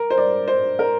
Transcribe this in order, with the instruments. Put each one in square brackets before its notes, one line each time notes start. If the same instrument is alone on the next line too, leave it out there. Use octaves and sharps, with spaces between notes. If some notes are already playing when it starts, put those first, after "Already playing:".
Already playing: [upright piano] A#4
C5
D5
C5
A#4